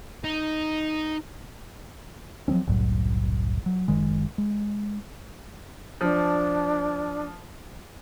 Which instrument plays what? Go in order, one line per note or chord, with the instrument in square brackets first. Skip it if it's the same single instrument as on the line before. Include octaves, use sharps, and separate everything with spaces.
[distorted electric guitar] D#4
[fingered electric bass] F3 F#3 C4 C#4
F#1 C2 A2 F#3
F#3
F#1 D#3 G#3
G#3
[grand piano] F3 [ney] D4